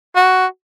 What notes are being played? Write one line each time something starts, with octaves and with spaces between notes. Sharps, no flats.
F#4